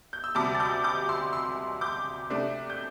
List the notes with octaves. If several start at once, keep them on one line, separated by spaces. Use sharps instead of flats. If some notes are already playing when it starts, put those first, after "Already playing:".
G6
E6
D2 C3 G3 A5 D6
A6
D6 G6
D6 G6
C6 E6
C6 E6
D6 G6
C3 A3 D4
G6